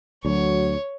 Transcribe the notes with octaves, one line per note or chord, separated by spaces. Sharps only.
D2 F#3 C#5